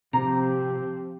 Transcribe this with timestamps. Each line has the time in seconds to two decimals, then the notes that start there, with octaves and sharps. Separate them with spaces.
0.13 C3 F3 C4 G4 A#5